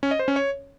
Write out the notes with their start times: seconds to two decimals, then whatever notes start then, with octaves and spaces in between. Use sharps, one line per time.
0.03 C#4
0.11 D#5
0.19 C5
0.28 C#4
0.36 C#5